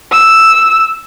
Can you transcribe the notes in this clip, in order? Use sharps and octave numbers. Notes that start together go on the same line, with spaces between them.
E6